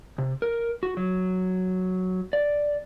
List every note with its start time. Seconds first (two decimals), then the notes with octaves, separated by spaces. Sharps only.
0.18 C3
0.42 A#4
0.83 F#4
0.97 F#3
2.33 D5